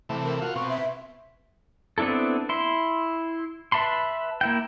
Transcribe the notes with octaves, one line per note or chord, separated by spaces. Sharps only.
C3 E3 A3
A#4
F4 F#4
B2 C4 C#6
E5
B3 C4 D4 E4 A4
E4 C6
B4 E5 A5 B5 C6
A#3 E4 G5